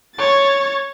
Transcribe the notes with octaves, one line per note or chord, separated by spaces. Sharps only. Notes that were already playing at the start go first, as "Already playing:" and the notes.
C#5 A6